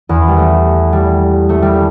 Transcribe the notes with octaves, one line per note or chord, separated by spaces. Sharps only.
E2
G3
A3
G3
A3
G3